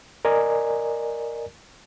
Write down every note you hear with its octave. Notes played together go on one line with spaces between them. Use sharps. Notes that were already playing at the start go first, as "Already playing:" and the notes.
A#4 D5 D#5 G#5 A#5